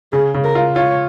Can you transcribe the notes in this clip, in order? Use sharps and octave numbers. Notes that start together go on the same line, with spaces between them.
C#3 G#4
C#3
A#4
F4
F4 C#5